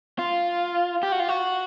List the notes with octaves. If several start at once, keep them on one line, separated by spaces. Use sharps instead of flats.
F4
G4
F#4
F4
F#4